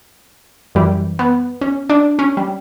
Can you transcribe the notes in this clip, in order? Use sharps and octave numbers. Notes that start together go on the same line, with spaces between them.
F#2 E3 G3
B3
C#4
D4
C#4
G3